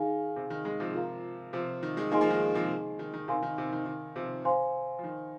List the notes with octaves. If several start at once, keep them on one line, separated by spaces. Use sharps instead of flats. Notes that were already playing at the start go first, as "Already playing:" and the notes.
Already playing: D#3 D#4 G#4 F5 G#5
C3
D#3
D#3 G#3
C3 F3
F4 A#4 F5 A#5
C3 F3
D#3
D#3 G#3
F3 A#3 D#4 G#4 D#5 G#5 C6
F3 A#3
D#3 G#3
C3 F3
D#3
D#3
C3 D#4 A#4 F5 G#5 C6
D#3
C3
D#3
D#3
C3 F3
C5 F5 G#5 C6
F3
D#3